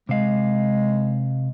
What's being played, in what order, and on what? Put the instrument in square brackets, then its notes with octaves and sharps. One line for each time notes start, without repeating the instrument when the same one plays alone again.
[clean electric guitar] C3 F5 [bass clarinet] G#3